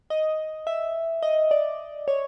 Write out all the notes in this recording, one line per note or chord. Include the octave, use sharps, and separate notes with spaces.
D#5
E5
D#5
D5
C#5